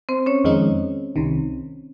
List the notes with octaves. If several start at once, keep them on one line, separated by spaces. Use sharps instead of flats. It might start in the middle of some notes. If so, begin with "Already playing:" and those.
C4 C5
C#4 C#5
F2 D#3 G#3 D#4
C2 C3 D#3